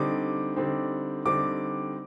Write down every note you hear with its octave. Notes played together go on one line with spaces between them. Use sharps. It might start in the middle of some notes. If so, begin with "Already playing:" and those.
Already playing: D3 G3 C4 D#4 D6
D3 G3 C4 D#4
D3 G3 C4 D#4 D6